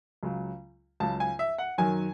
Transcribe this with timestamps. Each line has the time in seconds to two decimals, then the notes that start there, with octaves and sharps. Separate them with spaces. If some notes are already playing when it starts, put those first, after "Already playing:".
0.23 C#2 C#3 F#3
1.00 C#2 C#3 F#3 A5
1.20 G#5
1.39 E5
1.58 F#5
1.78 F#2 D#3 F#3 G#5